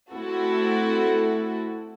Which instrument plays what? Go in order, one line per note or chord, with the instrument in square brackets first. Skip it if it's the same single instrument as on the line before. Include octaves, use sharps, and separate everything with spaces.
[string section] A3 C4 E4 F#4 A4